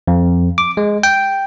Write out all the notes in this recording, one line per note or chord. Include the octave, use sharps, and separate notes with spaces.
F2
D6
G#3
G5